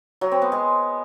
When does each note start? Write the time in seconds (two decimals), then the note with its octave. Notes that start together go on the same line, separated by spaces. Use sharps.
0.21 F#3
0.32 C4
0.42 B3
0.52 G#3